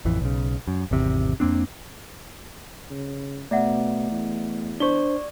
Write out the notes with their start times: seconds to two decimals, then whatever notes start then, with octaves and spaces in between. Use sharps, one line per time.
0.05 A1 F2 E3
0.21 B1 C#3
0.68 F#2
0.91 G#1 E2 C3
1.40 F2 A#3 C4 D4
2.91 C#3
3.51 B2 A3 D5 E5 F#5
4.11 E2
4.80 D4 C5 D5 C#6 G7